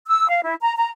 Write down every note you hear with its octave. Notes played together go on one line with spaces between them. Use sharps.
E6
F5
E4
A#5
A#5